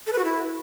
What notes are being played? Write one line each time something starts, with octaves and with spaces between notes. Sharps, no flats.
A4
B4
F#4
E4